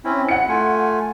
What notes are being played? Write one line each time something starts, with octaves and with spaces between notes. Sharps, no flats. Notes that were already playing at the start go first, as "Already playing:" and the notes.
C4 C#4 E4
E4 F#5 C#7
A3 F4 G#5